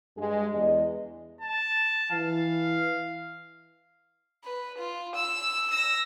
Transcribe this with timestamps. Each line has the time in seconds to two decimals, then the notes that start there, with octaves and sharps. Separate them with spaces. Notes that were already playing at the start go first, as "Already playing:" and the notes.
0.17 G2 G#3
0.54 E2 D#5
1.41 A5
2.12 E3 F5
4.44 B4
4.78 F4
5.15 E6 E7
5.71 E6 A#6